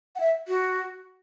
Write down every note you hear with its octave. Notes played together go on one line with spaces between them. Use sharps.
F#5
E5
F#4